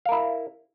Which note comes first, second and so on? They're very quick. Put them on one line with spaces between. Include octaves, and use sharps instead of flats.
F5 A#4 E4